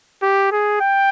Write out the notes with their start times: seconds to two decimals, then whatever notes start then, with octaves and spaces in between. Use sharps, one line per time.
0.22 G4
0.52 G#4
0.81 G5